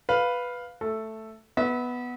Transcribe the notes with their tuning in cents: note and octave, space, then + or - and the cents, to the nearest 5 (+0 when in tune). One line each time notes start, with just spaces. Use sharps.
B4 +0 F5 +5
A3 +0 A4 +0
B3 +0 E5 -35